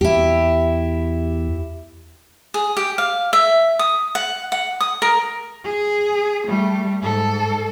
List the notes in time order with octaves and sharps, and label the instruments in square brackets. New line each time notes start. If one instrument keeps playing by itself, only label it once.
[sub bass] E2 [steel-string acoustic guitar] E4 G4
[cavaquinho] G#4
G4
F5
E5
D#6
F#5
F#5
D#6
A#4
[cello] G#4
G3 A3
G#2 A4